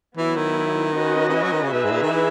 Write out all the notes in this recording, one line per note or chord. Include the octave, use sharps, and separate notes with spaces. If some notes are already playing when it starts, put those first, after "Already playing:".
E3 F#3 B3 E4
D#3
C#4 F#4 B4 D#5
D#3
E3
F#3
D#3
C#3
B2 D#4 G#4 B4 E5
G#2
A#2
D#3
E3